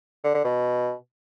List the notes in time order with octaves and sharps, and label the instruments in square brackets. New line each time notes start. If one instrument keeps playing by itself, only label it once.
[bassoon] D3
D3
B2